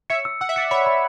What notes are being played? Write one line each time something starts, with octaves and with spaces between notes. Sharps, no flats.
C#5 E5 C#7
E6
F#5 E6
E5
D5 F#5 C#7
C#5 E5 B5
B5